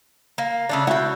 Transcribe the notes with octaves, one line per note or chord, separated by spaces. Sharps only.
A#3
C#3 A3 D4
E4 F#4 F#5 G5